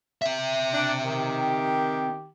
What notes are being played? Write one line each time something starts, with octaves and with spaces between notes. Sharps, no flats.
C4 E5
D4
D#3 G4